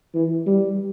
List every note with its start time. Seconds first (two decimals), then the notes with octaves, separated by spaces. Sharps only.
0.15 E3
0.47 G3